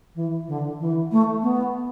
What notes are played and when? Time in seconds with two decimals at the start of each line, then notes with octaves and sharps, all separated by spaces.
0.15 E3
0.48 D3
0.80 E3
1.12 A3
1.43 B3